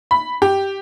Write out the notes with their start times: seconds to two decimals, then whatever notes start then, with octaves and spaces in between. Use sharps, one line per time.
0.11 B5
0.42 G4